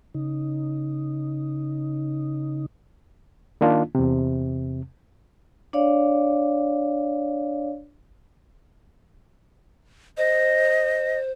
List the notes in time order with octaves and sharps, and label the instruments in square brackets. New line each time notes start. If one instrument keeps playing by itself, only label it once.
[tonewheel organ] C#3 D#4
[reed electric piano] D#3 A#3 D4 D#4 F4
E2 C3
[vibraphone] D4 C#5 D5 F5
[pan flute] C5 [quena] D#5